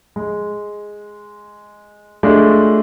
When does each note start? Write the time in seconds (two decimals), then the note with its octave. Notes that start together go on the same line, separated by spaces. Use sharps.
0.16 G#3
2.23 G#3 A3 D4 F4 G4